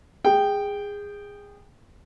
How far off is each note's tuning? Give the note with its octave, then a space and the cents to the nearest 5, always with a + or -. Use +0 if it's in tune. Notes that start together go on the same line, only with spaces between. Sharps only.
G#4 -20 G5 +0